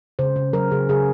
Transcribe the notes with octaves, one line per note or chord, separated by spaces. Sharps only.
C#3 C5
C#3
F#3 A#4
C#3 G#4
C#3 G#4